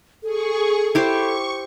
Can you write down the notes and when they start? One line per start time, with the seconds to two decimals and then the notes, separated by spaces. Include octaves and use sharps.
0.23 G#4 A4 C#6
0.95 E4 G4 C5 C#6